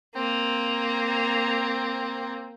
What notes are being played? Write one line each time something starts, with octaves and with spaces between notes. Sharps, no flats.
A#3 C4